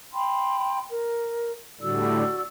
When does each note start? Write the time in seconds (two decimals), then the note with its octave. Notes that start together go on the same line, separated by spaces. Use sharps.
0.14 G5 B5 C6
0.90 A#4
1.81 A2 D3 G3 F#4 D5 E6